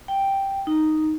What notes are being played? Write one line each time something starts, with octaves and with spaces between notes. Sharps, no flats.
G5
D#4